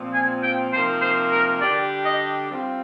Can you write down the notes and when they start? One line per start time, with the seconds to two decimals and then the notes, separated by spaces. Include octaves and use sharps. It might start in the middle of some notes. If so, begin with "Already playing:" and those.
Already playing: A#2 F3 C4
0.14 G#5
0.43 G5
0.72 C3 F3 A#3 D#4 C5
1.02 C5
1.32 A#4
1.61 D3 G3 D4 G4 D5
2.05 D#5
2.49 G3 C4 F4